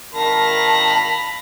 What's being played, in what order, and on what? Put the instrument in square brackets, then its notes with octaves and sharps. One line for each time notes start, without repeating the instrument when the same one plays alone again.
[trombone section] G#1 D#3 A#4 [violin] F5 A#6 [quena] A5 [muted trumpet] B5